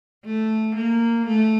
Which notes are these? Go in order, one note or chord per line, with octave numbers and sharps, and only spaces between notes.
A3
A#3
A3